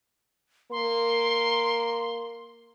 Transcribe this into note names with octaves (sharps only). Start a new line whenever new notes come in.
A#3 C6